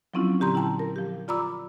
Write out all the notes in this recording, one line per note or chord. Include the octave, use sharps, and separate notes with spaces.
F3 F#3 C4 C#4 E4 F4
A#2 D3 G4 A#5 C6
E4 G5 A5 A#5
A#4
F3 G4
F4 D5 A#5 B5 D6 E6